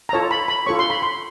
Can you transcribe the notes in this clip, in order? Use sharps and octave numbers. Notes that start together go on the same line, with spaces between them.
A#5
F4 A4 C#5 A5
B5
B5
F4 A4 C#5 C#6
C6
B5
C6